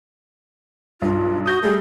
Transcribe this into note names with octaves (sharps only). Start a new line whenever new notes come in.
B1 G2 F4
F#4 D#6 G6 A#6
G3 A3 G#4